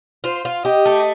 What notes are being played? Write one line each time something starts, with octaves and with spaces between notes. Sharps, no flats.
F4 C5
F4
G4 D#5
A3